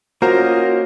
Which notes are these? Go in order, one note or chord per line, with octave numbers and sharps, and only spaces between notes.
A#3 C#4 F4 F#4 A#4 C5 D#5 A#5